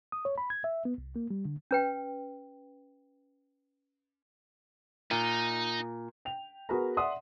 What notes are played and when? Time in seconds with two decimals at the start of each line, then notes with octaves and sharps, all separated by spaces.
0.12 D#6
0.25 C#5
0.38 B5
0.50 G#6
0.64 E5
0.85 B3
0.98 C2
1.16 A#3
1.31 G3
1.45 D3
1.71 C#4 B4 G5
5.11 A#2 D#4
6.25 G5 F7
6.69 B3 F#4 G#4 A#4 B4 A#5
6.97 D5 E5 F#5 C6 D#6